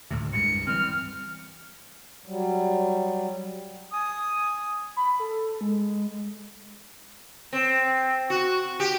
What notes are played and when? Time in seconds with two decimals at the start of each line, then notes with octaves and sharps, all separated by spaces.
0.10 D2 A2 C3
0.33 C2 G2 G#3 C#7
0.67 E3 G3 C4 F6
2.26 F#3 G3
3.93 G#5 D#6
4.97 B5
5.20 A4
5.61 G#3
7.53 C4
8.30 F#4
8.80 G4